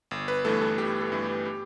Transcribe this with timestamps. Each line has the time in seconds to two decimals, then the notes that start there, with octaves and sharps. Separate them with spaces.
0.11 G1
0.28 B4
0.45 G2 E3 A3 A4
0.61 A4
0.78 G1 G4
1.01 A4
1.12 G2 E3 A3
1.23 G4
1.45 G4